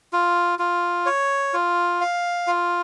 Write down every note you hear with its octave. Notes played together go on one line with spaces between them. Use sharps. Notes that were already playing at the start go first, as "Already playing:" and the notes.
F4
F4
C#5
F4
F5
F4